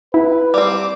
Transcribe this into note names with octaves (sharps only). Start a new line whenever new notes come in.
E4 B4
G3 C4 D6